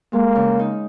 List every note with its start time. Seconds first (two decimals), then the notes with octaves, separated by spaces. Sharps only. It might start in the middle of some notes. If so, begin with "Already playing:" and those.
0.13 G#3 A#3
0.36 C#3
0.59 D#4